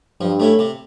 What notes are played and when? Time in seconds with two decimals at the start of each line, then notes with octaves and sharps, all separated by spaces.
0.20 G2 F3
0.40 A3 C#4 E4
0.59 C3